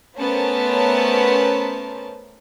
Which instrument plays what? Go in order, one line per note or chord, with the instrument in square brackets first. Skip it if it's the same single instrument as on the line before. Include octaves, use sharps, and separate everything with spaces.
[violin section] A3 B3 C#4 A#4 C5 A5